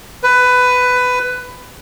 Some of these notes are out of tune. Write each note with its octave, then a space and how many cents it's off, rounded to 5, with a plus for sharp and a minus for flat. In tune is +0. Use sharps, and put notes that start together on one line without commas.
B4 +15